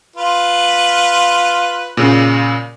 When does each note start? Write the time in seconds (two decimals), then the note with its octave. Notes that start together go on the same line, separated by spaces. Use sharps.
0.16 F4 B4
1.97 A#2 C#3